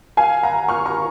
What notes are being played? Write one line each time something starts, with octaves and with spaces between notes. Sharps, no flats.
F5 G#5
F#5 A#5
C#6 F6
A#5 C#6